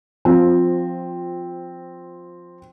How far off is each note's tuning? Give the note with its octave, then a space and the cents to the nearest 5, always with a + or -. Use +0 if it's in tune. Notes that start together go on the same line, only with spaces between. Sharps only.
F3 +10 C4 +0 F4 +15